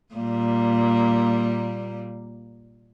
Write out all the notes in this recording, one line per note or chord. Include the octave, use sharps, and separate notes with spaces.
A#2 G3 A#3